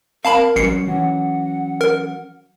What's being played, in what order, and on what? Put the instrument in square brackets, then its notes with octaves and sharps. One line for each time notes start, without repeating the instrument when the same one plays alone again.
[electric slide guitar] C4 [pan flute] A#4 [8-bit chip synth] F5 A5 B5
[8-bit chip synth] A1 C7 C#7 [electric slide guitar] F#3 C#4
[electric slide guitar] E3 F#3 C#4 [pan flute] F#5
[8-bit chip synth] A#4